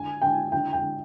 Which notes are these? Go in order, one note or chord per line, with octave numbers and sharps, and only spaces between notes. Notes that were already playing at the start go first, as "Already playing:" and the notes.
Already playing: D3 G#5
D3 G5
D3 G5
G5
D3